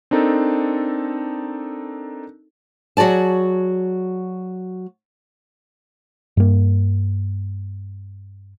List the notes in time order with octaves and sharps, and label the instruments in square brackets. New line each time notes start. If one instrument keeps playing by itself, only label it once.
[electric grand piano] C4 D4 D#4 A4 A#4
[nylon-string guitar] F#3 F#4 G#4 D5 A5
[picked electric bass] G2 A#3